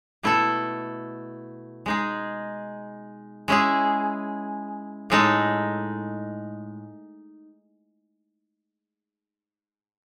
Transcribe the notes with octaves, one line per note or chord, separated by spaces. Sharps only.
B2 A3 E4 A4
G#3 D#4 G#4
G#3 C#4 E4 G#4
A2 G#3 D#4 A4